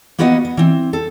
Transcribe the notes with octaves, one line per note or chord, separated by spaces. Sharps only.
A#3 B3 F#4 B4 D#5 F#5
B3
E3 C4
A4